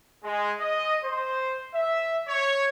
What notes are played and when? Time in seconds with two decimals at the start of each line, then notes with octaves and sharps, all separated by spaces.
0.24 G#3
0.60 D#5
1.04 C5
1.75 E5
2.28 C#5